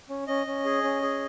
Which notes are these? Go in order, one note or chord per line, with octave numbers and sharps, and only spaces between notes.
C#4
C#4 D#5
C#4
G#4
C#4
G#4